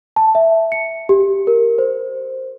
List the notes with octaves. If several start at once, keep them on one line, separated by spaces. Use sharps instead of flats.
A5
E5
C#7
G4
A#4
C5